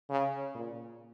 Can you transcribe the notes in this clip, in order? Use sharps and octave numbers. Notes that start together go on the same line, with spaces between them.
C#3
A#2